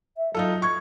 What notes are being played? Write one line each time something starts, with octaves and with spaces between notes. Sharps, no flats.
E5
F#3 D#4 F4 A4
C#6 G#6